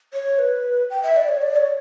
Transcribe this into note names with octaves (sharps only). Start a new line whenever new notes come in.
C#5
B4
G5
E5
D5
C#5
D5
C#5